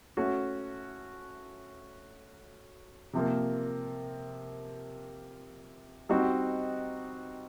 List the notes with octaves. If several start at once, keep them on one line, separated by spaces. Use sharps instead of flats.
A3 C#4 F#4
C3 F3 A#3
G3 C4 D#4 F#4